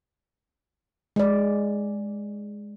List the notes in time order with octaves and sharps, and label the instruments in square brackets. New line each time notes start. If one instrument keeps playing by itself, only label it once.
[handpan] G#3 D5